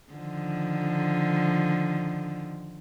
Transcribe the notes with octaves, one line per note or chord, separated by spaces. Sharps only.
D3 D#3 F3